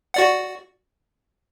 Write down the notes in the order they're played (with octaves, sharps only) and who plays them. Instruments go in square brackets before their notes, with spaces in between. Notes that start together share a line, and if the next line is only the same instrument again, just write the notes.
[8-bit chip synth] F#4 D5 F#5